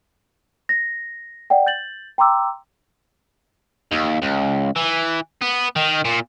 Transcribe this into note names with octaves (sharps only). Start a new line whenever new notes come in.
A#6
D5 F#5 G5
G6 A6 F#7
G5 A#5 C6 D6 E6
D#2
C#2
E3
B3
D#3
A#2